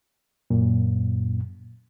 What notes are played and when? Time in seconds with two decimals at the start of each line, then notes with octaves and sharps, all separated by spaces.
0.50 F#2 A#2